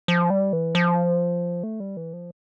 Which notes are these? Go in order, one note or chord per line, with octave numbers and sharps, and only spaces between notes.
F3
G3
E3
F3
A3
G3
E3
F3